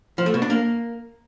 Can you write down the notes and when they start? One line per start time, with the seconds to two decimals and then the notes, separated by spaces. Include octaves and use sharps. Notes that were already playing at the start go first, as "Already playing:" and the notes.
0.18 F3
0.26 A3
0.34 B2
0.42 D4
0.50 A#3